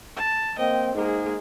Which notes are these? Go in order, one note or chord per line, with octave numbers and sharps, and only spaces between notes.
A5
A#3 C4 D#5 G5
G#2 G#3 A#3 D#4 G#4